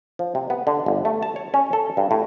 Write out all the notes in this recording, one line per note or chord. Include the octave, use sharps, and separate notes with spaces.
F3
C3
B3
D3
G1
A3
A5
C#5
C#4
A4
G2
A2